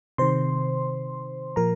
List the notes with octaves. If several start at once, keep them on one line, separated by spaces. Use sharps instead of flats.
C3 D#3 C5 C6
A#2 F3 A#4 A#5